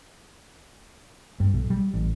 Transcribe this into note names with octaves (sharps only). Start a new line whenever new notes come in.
G2
B1
G3
A1